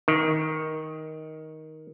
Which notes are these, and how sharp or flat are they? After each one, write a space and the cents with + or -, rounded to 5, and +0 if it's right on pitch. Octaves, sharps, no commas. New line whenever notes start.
D#3 +10